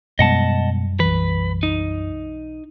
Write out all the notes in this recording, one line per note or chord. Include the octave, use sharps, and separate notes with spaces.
F#2 B2 G3 G#3 B3 D#5 F#5 A5
B1 E3 B4
D#4